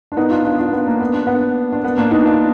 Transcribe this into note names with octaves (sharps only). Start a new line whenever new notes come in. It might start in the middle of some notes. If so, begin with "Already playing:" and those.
D4
B3 D#4
D4 F4
D4 F4
D4 F4
B3
A#3
B3
D4
B3
D4
B3
A#3 D4
B3 D#4
D4 F4